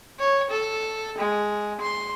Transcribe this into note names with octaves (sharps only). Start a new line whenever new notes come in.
C#5
A4
G#3
C6